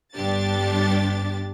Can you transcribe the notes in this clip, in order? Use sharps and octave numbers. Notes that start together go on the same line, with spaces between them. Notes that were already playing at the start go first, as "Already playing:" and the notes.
G1 G2 D4 G4 A6